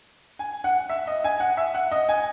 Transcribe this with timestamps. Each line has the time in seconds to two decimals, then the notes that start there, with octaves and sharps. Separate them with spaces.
0.39 G#5
0.64 F#5
0.89 E5
1.07 D#5
1.24 G#5
1.40 F#5
1.57 E5
1.75 F#5
1.91 D#5
2.09 G#5